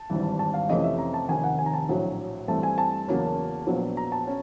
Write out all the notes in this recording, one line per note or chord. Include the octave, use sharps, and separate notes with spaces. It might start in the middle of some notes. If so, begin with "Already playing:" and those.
Already playing: A5
G#1 G2 E3
A5
F5
F2 C3 E3 A3 C#4 D#5
E5
A#5
A5
F1 D#2 D#3 G#5
F#5
G#5
A#5
A5
A#1 A2 F#3
G2 E3 A3 C4 A5
G#5
A5
E2 C#3 F#3 A#3 C#4
A#1 A#2 F#3 B3
A#5
A5
C#4